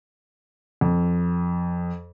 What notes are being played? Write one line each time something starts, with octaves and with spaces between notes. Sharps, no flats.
F2